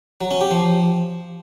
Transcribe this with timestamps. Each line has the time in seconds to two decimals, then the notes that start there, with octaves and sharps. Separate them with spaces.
0.21 F#3
0.31 C#4
0.41 G4
0.51 F3